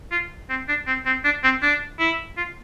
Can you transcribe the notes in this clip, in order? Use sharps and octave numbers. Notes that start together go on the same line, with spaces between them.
F4
C4
D4
C4
C4
D4
C4
D4
E4
F4